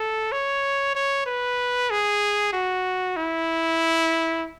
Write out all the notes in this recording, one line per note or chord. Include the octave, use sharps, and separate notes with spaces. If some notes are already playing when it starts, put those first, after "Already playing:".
Already playing: A4
C#5
C#5
B4
G#4
F#4
E4